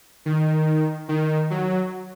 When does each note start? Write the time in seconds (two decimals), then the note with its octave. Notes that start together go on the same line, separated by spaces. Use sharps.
0.26 D#3
1.09 D#3
1.50 F#3